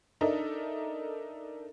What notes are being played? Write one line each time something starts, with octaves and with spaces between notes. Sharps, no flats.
D4 D#4 A4 A#4 D#5 E5